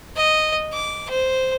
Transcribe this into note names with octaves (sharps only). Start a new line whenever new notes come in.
D#5
D6
C5